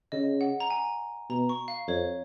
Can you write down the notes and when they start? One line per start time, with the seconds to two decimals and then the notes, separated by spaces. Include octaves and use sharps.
0.12 C#3 D#5
0.41 F#5
0.60 A#5
0.70 G#5
1.29 B2 A#5
1.49 C#6
1.68 F5
1.88 F2 C#5